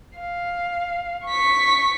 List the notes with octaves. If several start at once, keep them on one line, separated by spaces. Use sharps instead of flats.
F5
C#6 B6